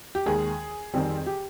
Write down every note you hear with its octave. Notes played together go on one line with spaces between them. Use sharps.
G4
D#2 D#3 G#3 G#4
F2 D#3 G3 C4
G4